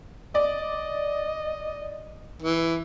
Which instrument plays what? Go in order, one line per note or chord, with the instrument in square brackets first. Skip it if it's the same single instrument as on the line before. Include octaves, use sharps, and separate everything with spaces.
[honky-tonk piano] D5 [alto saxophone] D#5
[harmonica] E3